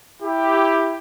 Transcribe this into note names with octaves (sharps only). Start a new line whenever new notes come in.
E4 G4